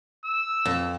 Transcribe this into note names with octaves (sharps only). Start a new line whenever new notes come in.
E6
F2